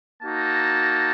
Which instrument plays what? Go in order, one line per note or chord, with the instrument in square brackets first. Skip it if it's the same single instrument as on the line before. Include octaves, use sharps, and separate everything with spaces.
[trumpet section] A#3 D#4 F#4 A5